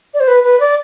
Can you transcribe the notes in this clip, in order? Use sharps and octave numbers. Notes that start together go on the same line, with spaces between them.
D5
C5
B4
B4
D5